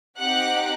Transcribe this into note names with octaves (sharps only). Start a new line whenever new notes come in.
C4 D#4 G4 F#5 F#6